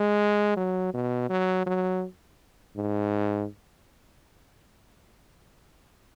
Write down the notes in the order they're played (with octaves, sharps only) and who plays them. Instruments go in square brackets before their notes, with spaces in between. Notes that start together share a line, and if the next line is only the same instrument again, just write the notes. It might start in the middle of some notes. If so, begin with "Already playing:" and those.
Already playing: [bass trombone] G#3
F#3
B2
F#3
F#3
G#2